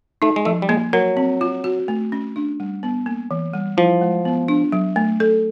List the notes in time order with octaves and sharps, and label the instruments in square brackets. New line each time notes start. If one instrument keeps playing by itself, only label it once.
[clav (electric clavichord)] A3 [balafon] D#4
[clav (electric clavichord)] G#3
[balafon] F3 [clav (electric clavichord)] A3
[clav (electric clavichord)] G3
[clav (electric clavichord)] G#3 [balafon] A#3
[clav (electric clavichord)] F#3 [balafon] A#4
[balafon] C4
F4
F#4
A3
C#4
D4
G3
B3
A#3
E3
G3
[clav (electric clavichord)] F3 [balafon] E4
[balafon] G#3
B3
D4
F#3
A3
A4